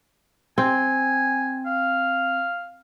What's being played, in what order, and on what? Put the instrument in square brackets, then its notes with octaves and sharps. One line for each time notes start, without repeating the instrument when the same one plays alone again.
[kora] C4 [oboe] G#5
[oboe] F5